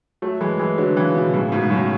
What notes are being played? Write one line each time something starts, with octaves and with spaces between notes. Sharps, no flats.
F#3 A3
E3 G#3
E3 G#3
D3 F#3
C#3 E3
B2 D3
A2 C#3
G#2 B2
F#2 A2